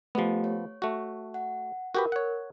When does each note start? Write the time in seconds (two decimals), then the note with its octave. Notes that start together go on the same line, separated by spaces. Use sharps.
0.15 F3 A3 B3 G4
0.44 C#5
0.82 A3 F#4
1.34 F#5
1.95 F#4 G4 A#4 B4
2.12 C#5 F#5